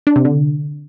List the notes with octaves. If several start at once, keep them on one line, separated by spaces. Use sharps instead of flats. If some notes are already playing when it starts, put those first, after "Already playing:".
D4
C3
D3